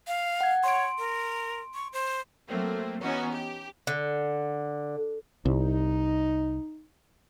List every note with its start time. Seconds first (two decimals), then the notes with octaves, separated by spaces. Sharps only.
0.07 F5
0.41 F#5 G#6
0.64 C#5 C6 D7
0.98 A#4
1.74 C#6
1.93 C5
2.48 F#3 A3 A#3 C4
3.02 E3 B3 C#4 D#4 F#4
3.33 G4
3.87 D3
5.45 C2 D#4